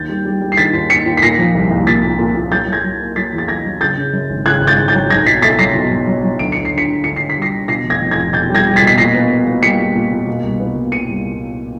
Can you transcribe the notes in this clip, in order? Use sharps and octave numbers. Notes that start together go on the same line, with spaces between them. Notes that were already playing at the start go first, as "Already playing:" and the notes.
Already playing: D#2 G6 A6
G3
G3
G3
C7
D#3 A6 B6
D#2
D#2 B6 C#7
D#2
B6
A#2 A#6 C7
F3
C2
C2
A#2 A6 B6
A#2
A#2
A#2
F#3 G6 A6
F#3
G#6 A#6
F#3
A#3
F#3 A6 B6
E2
A6
F#3 G#6 A#6
F#3
C#3 G6 A6
C#3
F#2
G#1
C#3 F#6 G#6
G#1
G6 A6
G#1
G6 A6
F#3
B1 G#6 A#6
B2 A6 B6
A3 A6 B6
F#3 A#6 C7
B2
B1
F#3
F#3
D2 D7
D2 C#7
C7
D3
B6 C#7
D2
D2 C#7
D2 C7
B6
G3
A#6 C7
D3
B2 A#6 C7
F1
G#6 A#6
F1
G#6 A#6
F1
B2 G6 A6
G3
G#6 A#6
G3
A6 B6
B2
B6
A#2 A#6 C7
B3
B3
B3
G3 B6 C#7
G3
A#2
A#2
B2
C2
B3
B2
B3 C#7 D#7
C2